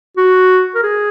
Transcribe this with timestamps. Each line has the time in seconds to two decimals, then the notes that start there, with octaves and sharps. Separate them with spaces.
0.17 F#4
0.75 A#4
0.83 G#4